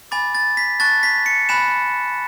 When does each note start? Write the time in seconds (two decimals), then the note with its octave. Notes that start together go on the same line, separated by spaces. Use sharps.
0.11 G#5 B5 D6 A6
0.35 A6
0.57 B6
0.80 A5 C#6 F#6 A6
1.03 B6
1.26 C#7
1.49 G#5 B5 F#6 E7